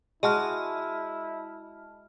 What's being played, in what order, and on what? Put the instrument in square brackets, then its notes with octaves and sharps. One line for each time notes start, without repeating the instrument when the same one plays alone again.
[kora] G#3 F#4 G#4 [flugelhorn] E4 [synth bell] D#5 A5 F6